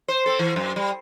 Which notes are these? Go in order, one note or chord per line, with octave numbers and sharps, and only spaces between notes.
C5
C4 A4
E3
F#2
G3